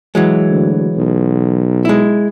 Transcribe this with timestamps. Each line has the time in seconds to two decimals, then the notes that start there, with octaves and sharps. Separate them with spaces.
0.15 E3 F#3 G#3
0.50 D2
0.96 B1
1.85 G#3 E4